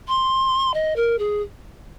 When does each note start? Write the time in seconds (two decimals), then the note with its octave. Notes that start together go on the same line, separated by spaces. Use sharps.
0.08 C6
0.74 D#5
0.96 A#4
1.18 G#4